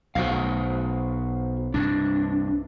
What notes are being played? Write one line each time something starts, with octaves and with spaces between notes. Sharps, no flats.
B1 F#4 C5 F5
C2 G2 D4